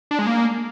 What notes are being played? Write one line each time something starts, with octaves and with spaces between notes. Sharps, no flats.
D4
G#3
A#3